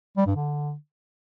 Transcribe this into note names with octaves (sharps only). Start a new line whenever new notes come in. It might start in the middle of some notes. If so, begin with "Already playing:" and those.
G3
G2
D3